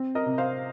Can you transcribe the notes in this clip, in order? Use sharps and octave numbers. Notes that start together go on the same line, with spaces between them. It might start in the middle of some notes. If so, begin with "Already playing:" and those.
Already playing: C4
A#4 D#5
C3
C5 F5